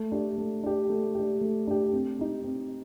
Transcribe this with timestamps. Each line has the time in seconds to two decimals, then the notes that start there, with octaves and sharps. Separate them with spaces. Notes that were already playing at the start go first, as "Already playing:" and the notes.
Already playing: A3
0.12 D4 G4
0.38 A3
0.63 D4 G4
0.89 A3
1.15 D4 G4
1.41 A3
1.67 D4 G4
1.93 C4
2.19 D#4 G4
2.44 C4